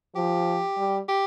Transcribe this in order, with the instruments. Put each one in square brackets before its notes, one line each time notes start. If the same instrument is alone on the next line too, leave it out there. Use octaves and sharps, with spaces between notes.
[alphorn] F3 [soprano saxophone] G4
[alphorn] G3
[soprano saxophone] G4